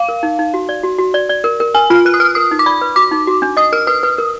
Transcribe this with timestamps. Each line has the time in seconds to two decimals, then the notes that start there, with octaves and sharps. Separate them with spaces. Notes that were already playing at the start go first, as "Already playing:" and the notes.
Already playing: F5
0.09 A#4
0.23 D#4
0.39 D#4
0.54 F#4
0.69 D5
0.83 F#4
0.98 F#4
1.14 D5
1.29 D5
1.44 A#4
1.60 A#4
1.74 A#4 G#5
1.90 F4 F6
2.05 B4 F#6
2.14 D#6
2.20 B4 F6
2.35 A#4 D#6
2.51 D#4
2.59 D6
2.66 D5 B5
2.81 B4
2.96 F#4 D6
3.11 D#4
3.27 F#4
3.42 D4
3.57 D#5 D#6
3.72 A#4 F6
3.87 B4 D#6
4.03 B4
4.18 A#4